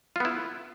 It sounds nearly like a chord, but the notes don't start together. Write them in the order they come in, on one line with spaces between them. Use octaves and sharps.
F4 B3 E4